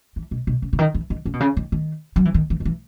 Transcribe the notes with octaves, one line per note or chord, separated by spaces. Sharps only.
E3
B2
B2
C#3
C#3
D#3
E3
D#3
C#3
B2
C#3
D#3
D#3
F#3
E3
D#3
E3
D#3
E3